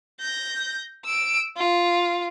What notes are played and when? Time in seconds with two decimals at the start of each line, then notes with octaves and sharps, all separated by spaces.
0.20 G6 A#6
1.05 E6 D7
1.57 F4